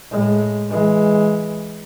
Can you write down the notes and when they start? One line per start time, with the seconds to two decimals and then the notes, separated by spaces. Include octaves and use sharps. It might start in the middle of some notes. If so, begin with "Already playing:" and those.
0.11 A2 G#3
0.70 E3 G#3